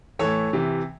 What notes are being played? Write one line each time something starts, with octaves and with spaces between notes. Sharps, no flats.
A2 E3 A4 C#5
C3 E3